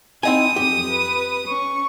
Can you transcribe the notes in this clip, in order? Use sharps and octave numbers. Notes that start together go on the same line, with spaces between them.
C4 D#4 E4 G#5 D#6
F2 F3 G4
B4
C#4 C#6